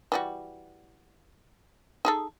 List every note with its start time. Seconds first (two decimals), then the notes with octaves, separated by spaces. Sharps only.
0.12 E3 G3 F#4
2.05 D#4 G#4 A4